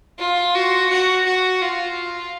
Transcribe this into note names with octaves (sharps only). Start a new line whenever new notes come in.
F4
F#4
F#4
F#4
F4